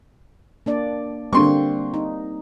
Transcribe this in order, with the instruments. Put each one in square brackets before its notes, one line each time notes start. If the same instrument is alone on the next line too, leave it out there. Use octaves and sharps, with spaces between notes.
[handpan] A#3 D4 D5
[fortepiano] D3 C6 C#6 [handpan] G3 A#3 C4
[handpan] D#4